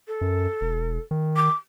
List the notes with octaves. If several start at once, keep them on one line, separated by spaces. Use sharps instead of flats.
A4
F#2
E1
D#3
D6